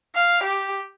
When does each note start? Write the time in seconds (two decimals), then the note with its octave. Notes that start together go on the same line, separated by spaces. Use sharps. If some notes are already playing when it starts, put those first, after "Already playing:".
0.15 F5
0.42 G4